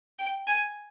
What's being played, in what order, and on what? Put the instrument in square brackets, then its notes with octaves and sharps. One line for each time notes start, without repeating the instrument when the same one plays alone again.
[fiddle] G5
G#5